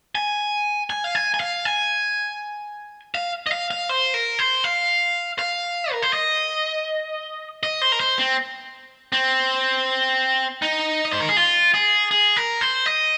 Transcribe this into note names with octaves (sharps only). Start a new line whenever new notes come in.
G#5
G#5
F5
G#5
G#5
F5
G#5
F5
D#5
F5
F5
C5
A#4
C5
F5
F5
A#4
C5
D#5
D#5
C5
A#4
C5
C4
C4
D#4
D#5
C5
A#4
G#4
F4
G#4
G#4
A#4
C5
D#5